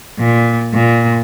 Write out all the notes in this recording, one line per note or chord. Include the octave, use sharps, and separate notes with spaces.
A#2
A#2